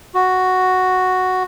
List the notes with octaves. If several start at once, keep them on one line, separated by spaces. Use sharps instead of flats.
F#4